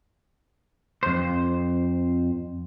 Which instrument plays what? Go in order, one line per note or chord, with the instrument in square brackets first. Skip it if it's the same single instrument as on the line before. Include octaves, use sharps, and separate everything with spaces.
[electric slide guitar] F2 C5